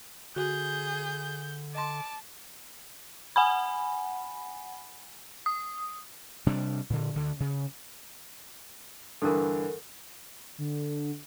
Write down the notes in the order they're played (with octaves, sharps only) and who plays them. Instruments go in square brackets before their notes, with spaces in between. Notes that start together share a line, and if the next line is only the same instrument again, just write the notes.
[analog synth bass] D3 [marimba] F#4 [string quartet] G#4 [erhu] G6
[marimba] D#5 C6 [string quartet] A5 [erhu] D6
[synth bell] F#5 G#5 B5
D#6
[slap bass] C3 G3 D4
A#2 D3
D2 D3
C#3
[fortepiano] G2 D3 E3 [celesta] A4 A#4
[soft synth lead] D3